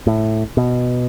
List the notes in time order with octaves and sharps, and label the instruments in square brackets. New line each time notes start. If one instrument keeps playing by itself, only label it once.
[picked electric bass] A2
B2